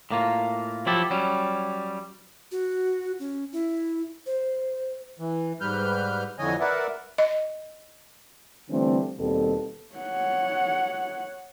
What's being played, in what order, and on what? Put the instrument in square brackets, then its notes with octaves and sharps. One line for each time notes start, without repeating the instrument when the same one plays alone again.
[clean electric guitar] A2 A#3 F4
F3 F#3 E4 G4 A4
F#3 G3 C#4
[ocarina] F#4
C#4
E4
C5
[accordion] E3
G#2 G3 B4 F6 G6
F2 D3 E3 C#5 D#5 G#5
A#4 B4 D5 E5 F#5
[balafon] D#5
[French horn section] D3 E3 G3 A3 C4 D4
D#2 B2 G3 C4 A4
[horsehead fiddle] C#5 F#5